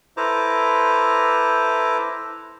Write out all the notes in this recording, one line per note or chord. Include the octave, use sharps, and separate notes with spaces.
E4 A4 B4 C5 A#5 D6